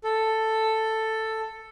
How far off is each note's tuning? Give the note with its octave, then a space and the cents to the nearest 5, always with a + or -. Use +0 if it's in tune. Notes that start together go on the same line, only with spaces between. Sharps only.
A4 +5